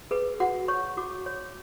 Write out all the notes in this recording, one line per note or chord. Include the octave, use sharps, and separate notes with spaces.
G#4 B4
F#4 F#5
C#5 C#6
F#4 D6
C#5